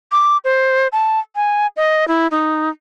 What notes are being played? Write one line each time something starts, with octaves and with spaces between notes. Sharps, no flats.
D6
C5
A5
G#5
D#5
E4
D#4